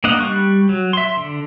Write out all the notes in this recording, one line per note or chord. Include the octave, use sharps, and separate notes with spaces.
A#3 D4 D#5 F5 F#5
G3 C#6 F#6
F#3
E5 C6
D3